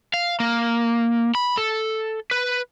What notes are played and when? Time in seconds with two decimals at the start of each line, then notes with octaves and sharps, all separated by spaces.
0.14 F5
0.40 A#3
1.35 B5
1.58 A4
2.31 B4